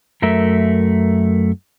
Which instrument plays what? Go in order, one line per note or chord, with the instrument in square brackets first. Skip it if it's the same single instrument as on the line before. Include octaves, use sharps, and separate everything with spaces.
[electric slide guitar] F#2 A3 A#4 E5